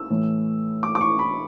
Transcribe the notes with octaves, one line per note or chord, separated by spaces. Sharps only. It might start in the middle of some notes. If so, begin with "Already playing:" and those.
Already playing: E6
A2 E3 A3
D6
D6
C#6
B5